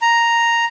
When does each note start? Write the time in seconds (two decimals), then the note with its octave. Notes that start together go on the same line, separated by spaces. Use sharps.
0.02 A#5